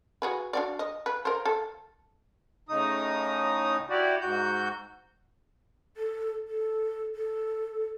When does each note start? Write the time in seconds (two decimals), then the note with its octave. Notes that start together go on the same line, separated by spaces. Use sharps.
0.22 F#4 G#4 B4
0.53 D4 F#4 D5
0.79 D#5
1.06 B4
1.25 A#4 C5
1.45 A4
2.69 A2 C#3 D#4 D#6
3.90 E4 F#4 G4 D5
4.21 G#2 F#4 G6
5.97 A4
6.48 A4
7.15 A4